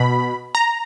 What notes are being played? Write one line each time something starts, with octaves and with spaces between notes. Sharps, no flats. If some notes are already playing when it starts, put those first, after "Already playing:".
Already playing: B2 B5
A#5